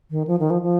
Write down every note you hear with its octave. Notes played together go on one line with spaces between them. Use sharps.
D#3
F3
D#3
F3
F3